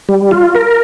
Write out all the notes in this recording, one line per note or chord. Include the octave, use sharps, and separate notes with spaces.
G3
F4
A#4